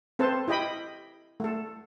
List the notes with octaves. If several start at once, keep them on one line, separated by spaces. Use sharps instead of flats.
C4 A4 B4 C5 A5
E4 G4 D#5 G5 B5
A3 A4